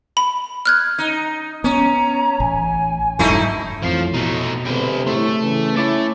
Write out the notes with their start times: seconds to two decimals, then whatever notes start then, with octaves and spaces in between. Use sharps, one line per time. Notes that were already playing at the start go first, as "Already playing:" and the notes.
0.17 B5
0.66 F6 F#6 G#6
0.98 D#4
1.64 B3 C#4 A#5
2.40 A1 G#5
3.19 F1 G#2 F#3 A3 D#4 E4
3.83 A1 F2 A2 F3 C7
4.14 B2 A3 D#4
4.66 G1 C3 G#3 G5
5.07 A2 A3 C6
5.42 C#3 E3
5.76 A3 C#4 E4 D6 A6